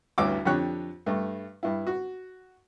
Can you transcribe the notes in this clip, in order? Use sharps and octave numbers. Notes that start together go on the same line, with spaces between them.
A1 D2 G2 C#5 D6 E6
F2 D3 G4 C#5 F#6
G2 A3
G2 E4
F#4